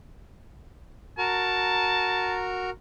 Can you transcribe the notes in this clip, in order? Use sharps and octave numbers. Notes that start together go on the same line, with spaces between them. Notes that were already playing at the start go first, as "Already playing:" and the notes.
F#4 A#4 A5 A#5